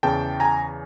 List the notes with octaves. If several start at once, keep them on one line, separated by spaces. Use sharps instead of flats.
E2 C#3 E3 G5 A5
G#5 A#5